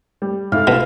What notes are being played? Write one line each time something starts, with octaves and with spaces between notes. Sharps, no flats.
G3
G#2 E4 A4 F5
B2 A3 E4 F4